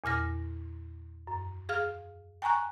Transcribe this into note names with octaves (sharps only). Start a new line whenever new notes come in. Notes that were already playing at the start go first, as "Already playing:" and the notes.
E2 A#2 F6 A#6
F#2
G#4 F5 F6
G5 G#5 A#5 C#6 F#6